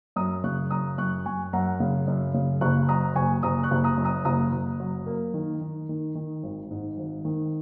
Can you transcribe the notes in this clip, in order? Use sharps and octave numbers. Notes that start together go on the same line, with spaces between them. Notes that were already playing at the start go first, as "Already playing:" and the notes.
F#2 A#5 D#6
C#3 C#6 F#6
F#2 A#5 D#6
F#2 C#6 F#6
F#2 G#5 C#6
F#2 F#5 A#5
C#3
F#2
C#3
F#1 C#6 F#6
F#3 A#5 D#6
F#1 G#5 C#6
F#1 A#5 D#6
C#6 F#6
F#1
A#5 D#6
F#2
A#5 D#6
F#1 A#5 D#6
F#1
F#3
A#3
D#3
D#3
D#3
D#3
G#1
G#2
G#1
D#3